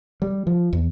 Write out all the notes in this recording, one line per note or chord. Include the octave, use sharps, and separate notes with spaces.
G3
F3
E2